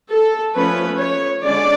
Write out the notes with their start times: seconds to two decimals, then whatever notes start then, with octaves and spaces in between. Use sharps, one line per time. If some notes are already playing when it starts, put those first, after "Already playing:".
0.10 A4
0.55 F3 A3 C#4 B4
0.98 C#5
1.43 D3 G#3 C#4 D5